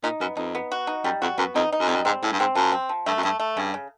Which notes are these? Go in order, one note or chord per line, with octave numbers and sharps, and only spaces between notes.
A#2 D#4
F#2 B3
F2 D#4
B3
F#4
D#4
F#2 G3
F2 F#4
F#2 B3
F2 D#4
D#4
F#2
F2 G3
F#2
G#2 C4
A2 C#3
G2
G#2 C4
F#2 F3
C4
F3
G2 A3
F#2
G2 A3
A3
G2 C#3
C#3